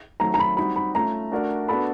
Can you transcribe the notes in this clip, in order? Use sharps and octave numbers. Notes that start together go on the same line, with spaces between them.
D#3 F#3 A3 C4 A#5
A#5
B5
G3 C4 D#4 F#4 B5
B5
A3 C#4 F4 A#5
A3 D4 F#4 A#4 D5
B3 D4 F#4 A4 B5